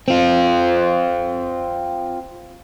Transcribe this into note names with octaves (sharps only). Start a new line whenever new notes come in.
C4 F4